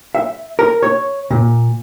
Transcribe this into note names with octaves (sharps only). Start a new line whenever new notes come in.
E5
A#4
C#5
A#2